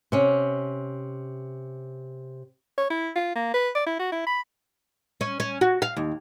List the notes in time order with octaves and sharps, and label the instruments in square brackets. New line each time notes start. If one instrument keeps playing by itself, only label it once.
[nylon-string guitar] C3 C#4
[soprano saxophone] C#5
E4
F4
A#3
B4
D5
E4
F#4
E4
B5
[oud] C#4
C#4
F#4
F5
D#2